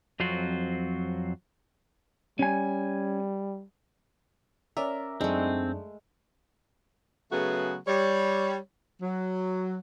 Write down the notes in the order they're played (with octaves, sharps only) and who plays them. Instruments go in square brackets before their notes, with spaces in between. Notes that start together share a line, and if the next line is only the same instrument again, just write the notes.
[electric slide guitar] F2 F#3 C4 F4 F#4
[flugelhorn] G3 [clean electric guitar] C#4 G#5
[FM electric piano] C#4 D5 E5 [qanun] A#4
[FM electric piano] F#2 D4 D#4 [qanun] G#3 A3 [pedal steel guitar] C4
[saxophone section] C#3 F#3 A3 B3 F#4 G#4
G3 C#5
F#3